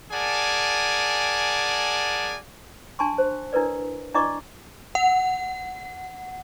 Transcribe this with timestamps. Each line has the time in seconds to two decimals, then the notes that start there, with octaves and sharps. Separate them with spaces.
0.11 G#4 A#4 D5 F#5 G#5 A5
2.99 D4 G#5 A5 C6 C#6
3.18 C5
3.53 D4 E4 A#4 B4 D5
4.15 D4 E4 D5 D#5 C#6 D6
4.95 F#5